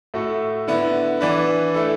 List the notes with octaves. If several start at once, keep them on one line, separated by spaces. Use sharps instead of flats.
A2 A3 F#4 A4
D3 B3 E4
E3 D4 B4
A3 E4 A4